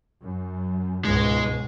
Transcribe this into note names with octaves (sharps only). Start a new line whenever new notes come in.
F#2
C#2 G#2 B2 G#3